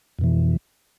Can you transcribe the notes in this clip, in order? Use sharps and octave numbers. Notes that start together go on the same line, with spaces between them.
F2 B2 E3